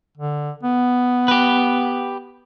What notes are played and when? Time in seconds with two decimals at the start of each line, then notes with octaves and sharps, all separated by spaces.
0.18 D3
0.63 B3
1.28 G4 B4